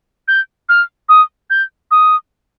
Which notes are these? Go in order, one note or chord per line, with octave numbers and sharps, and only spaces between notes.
G6
F6
D#6
G6
D#6